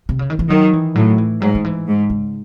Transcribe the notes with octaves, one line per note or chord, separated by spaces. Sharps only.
C3
C#3
D#3
E3
D#3 F#3
E3
A2 F#3
E3
G#2 F#3
D#3
E3
G#2
C#3